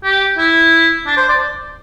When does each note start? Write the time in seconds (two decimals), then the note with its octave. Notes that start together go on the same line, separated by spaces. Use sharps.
0.04 G4
0.38 E4
1.06 D4
1.17 C5
1.29 D5